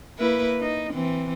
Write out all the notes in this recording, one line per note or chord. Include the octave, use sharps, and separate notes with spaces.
A#3 E4 B4
D#4
E3 C4